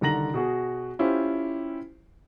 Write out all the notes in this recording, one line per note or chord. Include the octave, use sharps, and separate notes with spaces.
C2 D3 D#3 A#5 A#6 F#7
B2 F#4 G#4
C#4 E4 F4 G4 C5